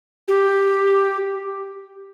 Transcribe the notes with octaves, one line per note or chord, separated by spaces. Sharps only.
G4